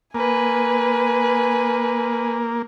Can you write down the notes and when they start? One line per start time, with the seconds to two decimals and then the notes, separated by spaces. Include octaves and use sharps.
0.15 A#3 B4 G#5